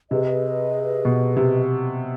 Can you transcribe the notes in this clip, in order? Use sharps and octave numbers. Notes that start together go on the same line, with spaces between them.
C3 G#4 B4 D#5
B2
C3